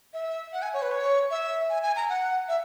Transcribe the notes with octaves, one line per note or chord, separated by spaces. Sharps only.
E5
F#5
G#5
C#5
B4
C#5
E5
G#5
G#5
A#5
F#5
E5